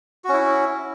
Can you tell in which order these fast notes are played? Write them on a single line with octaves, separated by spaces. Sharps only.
F#4 C#4 E4